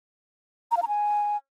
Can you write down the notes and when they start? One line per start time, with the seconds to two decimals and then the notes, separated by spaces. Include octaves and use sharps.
0.71 A#5
0.77 F5
0.82 A#5
0.88 G#5